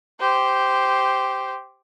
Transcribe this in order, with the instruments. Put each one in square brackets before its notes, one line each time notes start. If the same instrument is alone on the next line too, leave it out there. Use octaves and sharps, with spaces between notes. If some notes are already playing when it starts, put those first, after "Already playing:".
[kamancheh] G4 C5